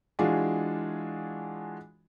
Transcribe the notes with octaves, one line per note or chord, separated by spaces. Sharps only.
E3 G#3 D4 F4 F#4 G#4